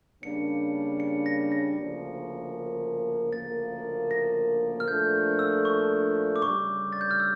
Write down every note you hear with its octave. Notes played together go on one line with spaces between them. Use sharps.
C#3 G3 A#3 D4 C#7
C#7
A#6
A#6
D2 C#3 F3 A#3
D2 C#3 F3 A#3 A6
A#6
F6
A#2 F3 A3 D4 A4 G6
E6
C#6
D6
D2 C#3 G3 C#6
A6
G6
F6
E6